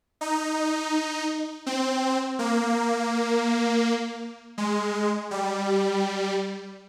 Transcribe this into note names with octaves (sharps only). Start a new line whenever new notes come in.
D#4
C4
A#3
G#3
G3